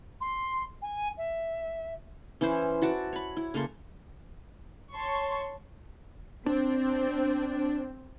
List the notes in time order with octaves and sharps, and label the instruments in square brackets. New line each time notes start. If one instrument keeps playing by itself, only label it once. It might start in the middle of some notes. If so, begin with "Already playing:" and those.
[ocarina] C6
G#5
E5
[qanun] E3 C#4 E4 C5
E4 F#4 A5 D6
C#5 B5
E4
C#3 A#3 A4 C6
[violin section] C#5 A5 C6 C#6
[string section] C4 [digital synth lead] D4